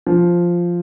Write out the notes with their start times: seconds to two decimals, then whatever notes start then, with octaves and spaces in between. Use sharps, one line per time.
0.07 F3